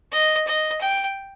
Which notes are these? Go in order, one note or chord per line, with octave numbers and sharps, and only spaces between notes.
D#5
D#5
G5